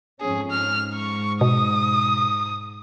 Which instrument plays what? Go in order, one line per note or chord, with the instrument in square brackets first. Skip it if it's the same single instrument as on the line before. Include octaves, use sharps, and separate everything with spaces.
[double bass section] F2 G#2 C#4 [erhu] G#4
[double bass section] G#2 [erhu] F6
[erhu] C#6
[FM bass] B2 [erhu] D#6